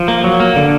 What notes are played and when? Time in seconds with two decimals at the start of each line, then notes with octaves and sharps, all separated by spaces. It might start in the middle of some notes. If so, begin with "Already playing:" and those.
Already playing: F3
0.08 A#3
0.24 F#3
0.40 A#3
0.56 D3